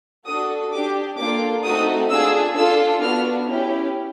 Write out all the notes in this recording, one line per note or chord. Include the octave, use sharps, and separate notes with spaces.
D4 F#4 A4 D#6
D4 G4 D6
A#3 D4 F4 A4 D6
A3 C4 D#4 F#4 A4 D#6
D4 F4 G#4 E6
D4 F4 A4 E6
B3 D4 F#4 F6
C#4 E4 G4